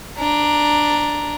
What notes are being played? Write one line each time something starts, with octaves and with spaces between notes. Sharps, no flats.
D4 A#5